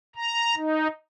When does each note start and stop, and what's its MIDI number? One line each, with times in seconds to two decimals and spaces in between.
0.15 0.55 82
0.55 0.87 63